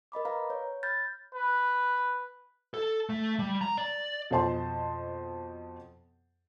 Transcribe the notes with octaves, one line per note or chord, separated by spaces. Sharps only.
A#4 D#5 B5 D6
B4 F5 A#5
C#5
B5 F6 G6 A6
B4
A4
A3
G3
A#5
D5
F2 B2 C5 A5 C6